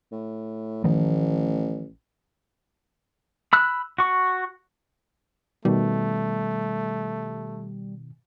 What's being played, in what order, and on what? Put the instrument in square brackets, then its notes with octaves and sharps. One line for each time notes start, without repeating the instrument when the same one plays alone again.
[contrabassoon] A2
[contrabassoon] A1 [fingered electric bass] D#3 F3 A3
[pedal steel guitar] B5 E6 F#6
F#4 C#6
[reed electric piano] B2 D#3 [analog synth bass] G3 [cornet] A3